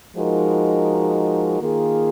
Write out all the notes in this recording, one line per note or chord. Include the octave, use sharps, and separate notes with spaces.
F3 G#3 D#4 F#4 A#4
D#3 A#3 F4 G#4